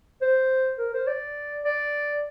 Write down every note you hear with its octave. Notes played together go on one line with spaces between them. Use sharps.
C5
A#4
C5
D5
D5